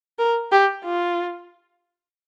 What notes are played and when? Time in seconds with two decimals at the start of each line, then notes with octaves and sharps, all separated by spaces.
0.19 A#4
0.52 G4
0.84 F4